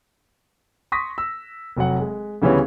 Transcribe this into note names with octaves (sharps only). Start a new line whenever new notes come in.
C6 C#6 D#6 A#6 B6
E6
F1 F#3 F#5
G#3
D2 C#3 E3 G3 B3 C#4